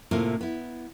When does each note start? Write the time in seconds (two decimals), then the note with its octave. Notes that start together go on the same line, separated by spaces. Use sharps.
0.11 A2 C3 A#3 F4
0.41 B3 E4